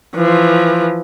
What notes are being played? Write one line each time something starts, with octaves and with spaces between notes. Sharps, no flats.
E3 F3